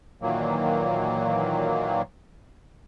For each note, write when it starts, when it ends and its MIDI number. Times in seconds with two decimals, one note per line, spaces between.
0.22 2.02 46
0.22 2.02 51
0.22 2.02 52
0.22 2.02 54
0.22 2.02 58